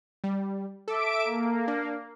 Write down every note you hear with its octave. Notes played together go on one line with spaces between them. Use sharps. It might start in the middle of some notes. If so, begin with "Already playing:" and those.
G3
A4 E5 D6 D7
A#3
D4